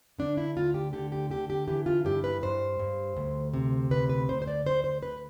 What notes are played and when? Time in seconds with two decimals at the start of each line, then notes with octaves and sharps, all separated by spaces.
0.19 D3 D4
0.37 E4
0.56 D2 F4
0.74 G4
0.93 D3 G4
1.12 G4
1.30 D3 G4
1.50 G4
1.68 E3 G4
1.86 F4
2.05 G2 G4
2.24 B4
2.43 G2 C5
2.79 G2
3.17 D2
3.54 C3
3.91 D2 B4
4.10 B4
4.29 D2 C5
4.42 C5
4.48 D5
4.66 D2 C5
4.84 C5
5.03 D2 B4